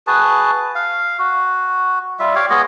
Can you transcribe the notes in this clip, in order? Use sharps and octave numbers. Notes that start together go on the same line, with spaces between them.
F#4 G#4 B4 A5
F5
F#4
G3 F4 E5
G4 C#5 D5 F5
G#3 B3 C#5 D#5